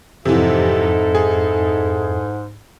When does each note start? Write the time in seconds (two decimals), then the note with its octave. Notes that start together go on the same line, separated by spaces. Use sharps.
0.25 F2 G#2 C3 E3 D#4 E4 A4
1.15 G#4